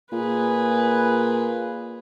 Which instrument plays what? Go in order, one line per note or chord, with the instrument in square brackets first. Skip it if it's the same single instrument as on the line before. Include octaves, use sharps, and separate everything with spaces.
[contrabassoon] A#2 [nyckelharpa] G#4 B4